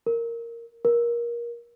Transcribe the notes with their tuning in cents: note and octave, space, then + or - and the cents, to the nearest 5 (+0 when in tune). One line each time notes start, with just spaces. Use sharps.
A#4 -5
A#4 +20